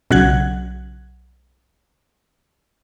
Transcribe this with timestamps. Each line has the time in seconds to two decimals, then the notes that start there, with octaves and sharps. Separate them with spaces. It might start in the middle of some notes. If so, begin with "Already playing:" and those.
0.11 B1 C#3 F#3 F#5 F#6 G#6